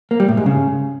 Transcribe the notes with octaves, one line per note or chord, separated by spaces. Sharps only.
A#3
G3
A2
G#2
C#3